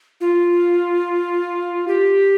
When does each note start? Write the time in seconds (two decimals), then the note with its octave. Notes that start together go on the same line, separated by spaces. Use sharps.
0.21 F4
1.88 G4